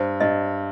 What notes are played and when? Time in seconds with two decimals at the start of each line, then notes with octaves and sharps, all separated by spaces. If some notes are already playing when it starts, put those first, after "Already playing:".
Already playing: G2 C5
0.20 G2 D#5